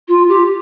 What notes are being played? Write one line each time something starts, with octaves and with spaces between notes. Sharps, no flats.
F4
G4